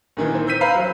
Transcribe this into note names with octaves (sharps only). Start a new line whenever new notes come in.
A#2 D#3 E3
C4
E6 G6 B6 D#7
B4 C5 F5 A#5 B5
F#3